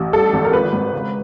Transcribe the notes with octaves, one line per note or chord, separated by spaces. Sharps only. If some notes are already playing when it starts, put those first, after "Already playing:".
Already playing: A1
G3 A4
G#1
A#4
F3 B4
G#2
C#3